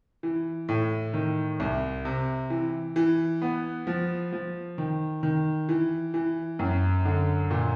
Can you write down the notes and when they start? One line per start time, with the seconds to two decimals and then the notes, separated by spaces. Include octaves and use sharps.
0.23 E3
0.69 A2
1.14 D#3
1.60 C2
2.05 C3
2.50 E3
2.96 E3
3.42 B3
3.87 F3
4.32 F3
4.78 D#3
5.23 D#3
5.69 E3
6.14 E3
6.59 F#2
7.05 D3
7.51 A#2